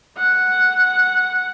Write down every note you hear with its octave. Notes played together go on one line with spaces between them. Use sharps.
F#5